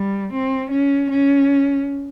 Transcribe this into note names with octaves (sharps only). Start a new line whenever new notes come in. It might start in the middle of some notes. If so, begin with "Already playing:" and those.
Already playing: G3
C4
C#4
C#4